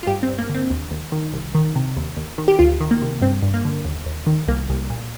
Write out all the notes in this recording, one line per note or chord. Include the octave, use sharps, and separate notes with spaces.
F4
G2 G4
C4
G2
A#3
D3 C4
D#2
D#2
D#3
C2
D#3
C3
D#2
D#2
D#3
G4
D2 F4
D#3
A#3
C3
G2 C4
G2
A#3
D3
D#2
D#2
D#3
C2 A#3
C2
A#2